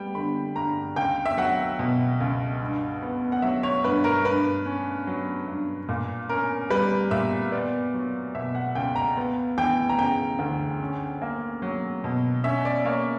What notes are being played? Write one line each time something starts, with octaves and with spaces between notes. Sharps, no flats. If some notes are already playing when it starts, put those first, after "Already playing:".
Already playing: G3 B3 G5
D3 B5
G2 A#5
C#2 G5
E5
F#3 F#5
B2
C#2
G2
B3
F#5
F#3 E5
C#5
G2 B4
A#4
G2 B4
C#4
F#3
G2
A#2
C#4 A#4
G3 B4
A#2 E5
B3 D5
F#3
B2 E5
F#5
C#2 G5
A#5
B3
E3 G5
A#5
C#3 G5
D2
C#4
A#3
F#3
B2
C#4 E5
D5
A#3 C#5